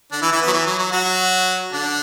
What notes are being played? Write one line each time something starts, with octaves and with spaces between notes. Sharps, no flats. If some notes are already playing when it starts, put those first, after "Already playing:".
D3 D4
E3 E4
E3 E4
B3
F#3
E3
F#3
F#3
F#3 F#4
D3 D4